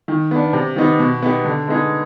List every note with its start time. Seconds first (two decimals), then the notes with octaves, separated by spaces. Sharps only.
0.08 D#3
0.31 B3 D4
0.53 C3
0.76 D#3 B3 D#4
0.99 B2
1.22 B3 D#4 G4
1.45 D3
1.67 G#3 B3 D#4 G#4